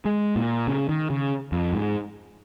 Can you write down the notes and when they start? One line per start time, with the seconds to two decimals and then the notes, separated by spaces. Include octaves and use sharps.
0.05 G#3
0.36 A#2
0.67 C#3
0.89 D#3
1.10 C#3
1.52 F2
1.73 G#2